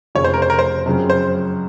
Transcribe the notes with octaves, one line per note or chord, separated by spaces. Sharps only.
F1 F2 C#3 C#5
C5
A#4
C5
A#4
C5
F#2 C#3 F3 C4
C5